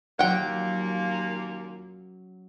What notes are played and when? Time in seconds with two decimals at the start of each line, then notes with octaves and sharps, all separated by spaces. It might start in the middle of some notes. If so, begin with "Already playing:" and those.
0.19 D#2 A#2 F#3 A#3 C#4 F#5 G5